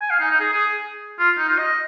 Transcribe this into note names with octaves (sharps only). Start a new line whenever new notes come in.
G#5
F5
D#4
D#4
G#4
G#4
F4
D#4
F4
D#5